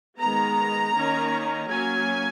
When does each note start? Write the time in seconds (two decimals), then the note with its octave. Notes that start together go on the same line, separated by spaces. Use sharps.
0.19 D#3 G#3 B3 A#5
0.95 D#3 A#3 C#4
1.70 F#3 A#3 C#4 G#5